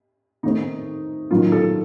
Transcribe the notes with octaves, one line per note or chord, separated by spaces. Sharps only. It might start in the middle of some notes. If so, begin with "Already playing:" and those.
D#3 A3 C4 D#4
D#3 F#3 A#3 F4
A4